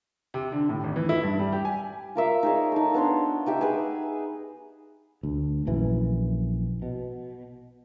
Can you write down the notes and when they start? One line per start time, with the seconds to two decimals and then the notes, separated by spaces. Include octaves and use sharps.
0.34 C3
0.52 D3
0.69 A2
0.84 G#1
0.96 E3
1.09 E4
1.23 G2
1.39 G3
1.52 G4
1.65 G#5
2.15 F4 A#4 E5 F5
2.43 D#4 G#4 C#5
2.72 D#4 A4
2.94 B3 D4 C#5 C6
3.46 D#4 G4 E5
3.61 G#4 B4
5.23 D2
5.67 A#1 F#2 E3
6.82 B2